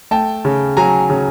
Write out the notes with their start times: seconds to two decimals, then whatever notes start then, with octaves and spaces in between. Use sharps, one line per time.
0.11 A3 G5 A5
0.45 C#3
0.77 F#3 G#5 A#5
1.10 C#3